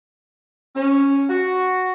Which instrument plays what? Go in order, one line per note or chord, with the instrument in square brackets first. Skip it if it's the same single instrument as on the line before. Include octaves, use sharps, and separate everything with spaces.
[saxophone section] C#4
F#4